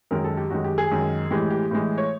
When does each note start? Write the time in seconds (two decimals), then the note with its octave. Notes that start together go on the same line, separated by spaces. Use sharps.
0.11 F#2 D#3 G#3 A#4
0.24 A4
0.37 G4
0.50 F#2 D#3 G#3 F#4
0.64 G4
0.78 G#4
0.91 F#2 D#3 G#3
1.31 A2 E3 G#3 G4
1.50 G4
1.71 A2 E3 G#3
1.98 C#5